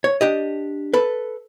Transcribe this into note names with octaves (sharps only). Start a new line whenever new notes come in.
C#5
D4 G4 D#5
A4 B4